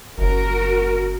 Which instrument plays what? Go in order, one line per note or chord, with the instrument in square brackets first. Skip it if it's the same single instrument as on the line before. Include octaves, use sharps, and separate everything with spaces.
[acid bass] F#1 [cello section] F#4 A#4